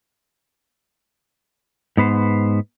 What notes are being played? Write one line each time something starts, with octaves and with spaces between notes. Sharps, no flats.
G#2 B3 B4 C5